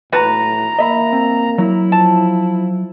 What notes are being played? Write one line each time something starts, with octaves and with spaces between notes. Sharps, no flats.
A2 F#4 B4 A#5
A#3 D#5 E5 B5
C4
F#3 E4
F3 A5